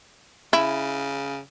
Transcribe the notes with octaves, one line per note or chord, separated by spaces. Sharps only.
C#3 E4